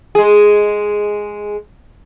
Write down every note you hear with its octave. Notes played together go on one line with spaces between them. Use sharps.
G#3 G#4